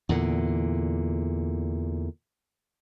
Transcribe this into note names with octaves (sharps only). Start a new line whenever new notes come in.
E2 A#2 D3